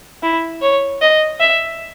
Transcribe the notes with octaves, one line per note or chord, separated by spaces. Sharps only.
E4
C#5
D#5
E5